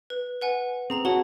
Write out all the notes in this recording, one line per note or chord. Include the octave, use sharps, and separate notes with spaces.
B4
B4 F#5 G#5
C4 G#4 A#5 F7
F#4 C#5 A5 G7